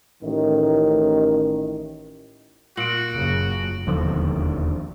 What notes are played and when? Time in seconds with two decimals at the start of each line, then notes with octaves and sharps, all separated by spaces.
0.22 A1 D#3
2.77 A#2 F#4 D7 F#7
3.14 F#1 C#3
3.87 E1 D#2 D3 F3